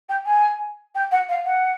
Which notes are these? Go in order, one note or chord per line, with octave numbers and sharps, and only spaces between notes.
G5
G#5
G5
F#5
F5
F#5